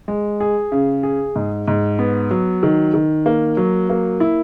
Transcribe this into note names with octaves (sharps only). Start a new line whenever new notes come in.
G#3
G#4
C#3
G#4
G#2
G#2
B3
F#3
D#3
D#3
A#3
F#3
A#3
E4